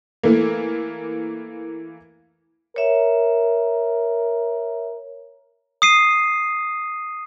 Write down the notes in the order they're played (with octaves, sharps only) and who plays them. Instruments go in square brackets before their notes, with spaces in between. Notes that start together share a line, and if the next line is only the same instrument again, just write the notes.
[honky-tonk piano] E3 A3 A#3
[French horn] A#4 [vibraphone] C#5 E5
[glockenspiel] D#6 C7 D#7